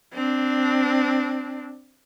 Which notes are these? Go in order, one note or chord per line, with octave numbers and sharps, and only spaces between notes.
C4 D4